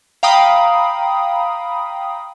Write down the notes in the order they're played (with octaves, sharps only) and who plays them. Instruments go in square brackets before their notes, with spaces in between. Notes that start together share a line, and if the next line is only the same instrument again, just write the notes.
[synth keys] F5 G5 A#5 B5 D#6